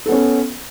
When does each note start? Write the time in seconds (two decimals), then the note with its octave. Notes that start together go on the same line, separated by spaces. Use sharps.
0.06 A4
0.09 B3
0.12 C#4